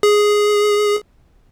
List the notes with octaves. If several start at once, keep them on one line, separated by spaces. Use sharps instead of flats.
G#4